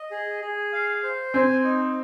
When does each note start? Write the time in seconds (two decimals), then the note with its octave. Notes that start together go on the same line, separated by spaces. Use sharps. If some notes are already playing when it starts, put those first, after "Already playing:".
Already playing: D#5
0.11 G#4
0.42 G#4
0.73 F5
1.03 C5
1.33 C4 G#5
1.64 D#4